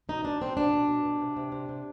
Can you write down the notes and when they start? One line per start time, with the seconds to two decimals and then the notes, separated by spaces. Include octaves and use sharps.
0.09 B2 D#4
0.25 B2 D4
0.41 B2 C4
0.57 B2 D4
0.73 B2
0.88 B2
1.05 B2
1.21 C3
1.37 C3
1.52 C3
1.69 C3